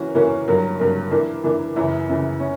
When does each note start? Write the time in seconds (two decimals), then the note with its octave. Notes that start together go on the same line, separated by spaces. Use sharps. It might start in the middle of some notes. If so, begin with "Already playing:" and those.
Already playing: E3 A#3 C#4 F#4
0.15 E3 A#3 C#4 F#4
0.48 G2 F#3 A#3
0.80 G2 F#3 A#3
1.11 E3 A#3 D4
1.44 E3 A#3 D4
1.76 F#2 C#3 E3
2.09 F#2 C#3 E3
2.40 C#4